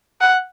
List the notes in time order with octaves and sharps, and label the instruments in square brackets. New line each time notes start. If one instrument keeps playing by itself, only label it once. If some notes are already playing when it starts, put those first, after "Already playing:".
[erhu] F#5